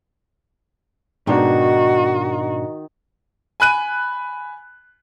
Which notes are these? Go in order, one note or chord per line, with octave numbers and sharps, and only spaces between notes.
G#2 B2 D#3 D4 D#4 F#4
G#5 B5 F#6 D#7